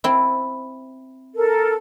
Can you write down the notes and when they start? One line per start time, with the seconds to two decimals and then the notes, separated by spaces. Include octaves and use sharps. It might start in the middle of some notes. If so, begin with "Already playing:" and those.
0.04 C4 E4
1.35 A4 A#4